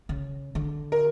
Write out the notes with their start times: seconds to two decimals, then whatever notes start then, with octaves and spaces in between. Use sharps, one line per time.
0.09 C#3
0.55 D3
0.92 A#4